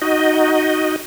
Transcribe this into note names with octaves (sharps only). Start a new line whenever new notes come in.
D#4 F#4 D#5